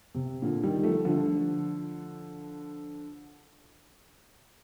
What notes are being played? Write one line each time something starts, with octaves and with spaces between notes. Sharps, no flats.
C3
A#2 D3
D#3 G3
F3 A3
D3 F3